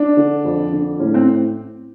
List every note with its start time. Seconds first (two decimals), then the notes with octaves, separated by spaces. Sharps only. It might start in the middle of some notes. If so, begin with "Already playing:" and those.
Already playing: D4
0.17 D3
0.45 F2
0.72 D3
0.99 A2 C#4
1.14 C4